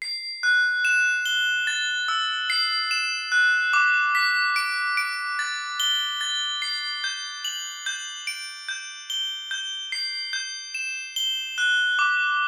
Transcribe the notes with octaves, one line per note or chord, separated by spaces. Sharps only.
C7
F#6
E7
G7
A6
E6
C7
E7
F#6
D6
B6
D7
D7
A6
G7
A6
C7
G6
F#7
G6
D7
G6
G7
G6
C7
G6
E7
G7
F#6
D6